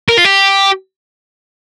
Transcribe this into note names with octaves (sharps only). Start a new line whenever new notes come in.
A#4
F4
G4